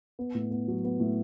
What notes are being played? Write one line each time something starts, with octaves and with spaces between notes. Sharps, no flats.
B3
A2
B3
F#3
B3
A2